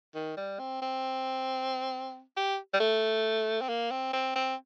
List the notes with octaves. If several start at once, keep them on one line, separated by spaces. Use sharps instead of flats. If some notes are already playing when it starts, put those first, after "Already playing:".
D#3
G3
C4
C4
G4
G3
A3
C4
A#3
C4
C4
C4